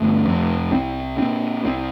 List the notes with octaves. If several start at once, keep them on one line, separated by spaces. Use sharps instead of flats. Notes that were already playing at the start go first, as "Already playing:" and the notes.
Already playing: G1 A3
F2 C3
C2 C4
A#2 C4
C2 C4